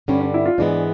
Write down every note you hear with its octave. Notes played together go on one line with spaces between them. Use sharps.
G2 D3 G3 C#4
D4
E4
F4
G#2 E3 G#3 B3 D4